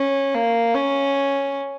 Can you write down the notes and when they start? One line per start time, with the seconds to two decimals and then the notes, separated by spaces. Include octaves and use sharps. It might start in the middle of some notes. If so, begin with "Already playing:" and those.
Already playing: C#4
0.35 A#3
0.75 C#4